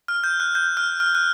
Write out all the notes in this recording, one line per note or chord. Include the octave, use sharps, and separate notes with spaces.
F6
G6
F#6
G6
F6
F6
F#6